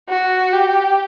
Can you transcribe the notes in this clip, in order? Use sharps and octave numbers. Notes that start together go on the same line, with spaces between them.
F#4
G4